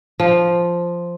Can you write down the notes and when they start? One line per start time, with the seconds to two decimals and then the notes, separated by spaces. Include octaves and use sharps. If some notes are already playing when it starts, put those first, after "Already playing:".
0.20 F3